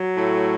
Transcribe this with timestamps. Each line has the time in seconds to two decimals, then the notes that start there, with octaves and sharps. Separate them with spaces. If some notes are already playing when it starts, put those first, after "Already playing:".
Already playing: F#3
0.16 A2 A3